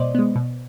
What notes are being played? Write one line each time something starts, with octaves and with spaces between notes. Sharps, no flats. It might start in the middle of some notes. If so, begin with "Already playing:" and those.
Already playing: B2 G#3 B3 C5 D5 D#5
G#3 B3
B2